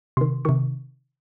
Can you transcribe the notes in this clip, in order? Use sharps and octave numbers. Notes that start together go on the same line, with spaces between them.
C3 D#3 C6
C3 D#3 C#6